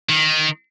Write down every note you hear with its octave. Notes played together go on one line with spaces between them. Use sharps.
D#3